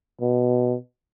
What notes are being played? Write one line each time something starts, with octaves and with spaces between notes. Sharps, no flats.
B2